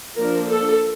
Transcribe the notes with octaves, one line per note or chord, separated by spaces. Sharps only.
F3 A#3 D4 A#4
A4